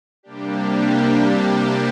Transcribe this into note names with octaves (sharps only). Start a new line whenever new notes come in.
C3 G3 A#3 D4 G4